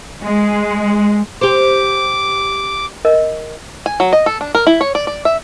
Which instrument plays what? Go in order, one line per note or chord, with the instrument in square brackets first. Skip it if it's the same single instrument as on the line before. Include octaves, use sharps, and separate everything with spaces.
[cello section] G#3
[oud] G4 C5 [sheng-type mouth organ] D6
[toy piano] A#4 D#5
[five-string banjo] G#5
F#3
D#5
A4
D4
A#4
E4
C#5
D5
D5
E5